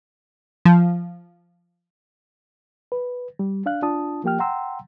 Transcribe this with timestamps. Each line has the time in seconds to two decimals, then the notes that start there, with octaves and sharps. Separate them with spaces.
0.65 F3
2.92 B4
3.39 G3
3.66 D4 F5 F#6
3.83 D4 F4 A5 D#6
4.24 F3 A#3 G4 G5 F6
4.39 F#5 G5 A#5 C6 E6